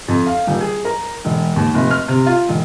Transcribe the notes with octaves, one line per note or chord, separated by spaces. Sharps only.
F2
F5
D#1
G#4
A#4
E1
D#2
F1
F6
C3
F4
E1